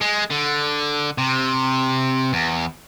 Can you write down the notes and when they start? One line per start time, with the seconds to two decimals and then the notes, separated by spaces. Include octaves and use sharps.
0.01 G#3
0.31 D3
1.18 C3
2.33 E2